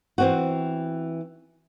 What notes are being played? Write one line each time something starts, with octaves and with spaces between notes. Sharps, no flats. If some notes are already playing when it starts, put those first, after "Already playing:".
E3 C4 F#4